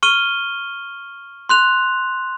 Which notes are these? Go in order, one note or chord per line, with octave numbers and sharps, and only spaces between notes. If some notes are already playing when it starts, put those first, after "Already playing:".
C#6 F6 D#7 G7
C6 F#6 F7